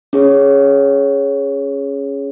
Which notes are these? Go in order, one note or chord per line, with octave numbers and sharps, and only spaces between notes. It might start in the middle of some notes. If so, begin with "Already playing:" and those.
C#4 G#4 C#5